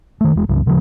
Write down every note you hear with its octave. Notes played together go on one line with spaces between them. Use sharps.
D#3 A3
E1 G#3
C#2 G2 C#3 F#3
D#2 C#3 E3 F3